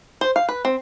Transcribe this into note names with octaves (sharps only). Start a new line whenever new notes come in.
C5
F5
B4
C4